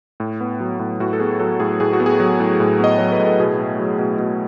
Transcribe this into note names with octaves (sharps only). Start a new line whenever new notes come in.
A2
B3
F#3
A2
A2 F#4
A4
B3 G#4
F#3 A4
A2 G#4
A2 G#4
F#4
B3
G#4
F#3
A2
A2
B3 D#5
F#3 C#5
B4
A2
A4
B2 G#4
A3
F#3
B2
B2